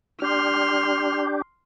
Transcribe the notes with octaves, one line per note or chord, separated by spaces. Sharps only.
D4 G4 C6 F6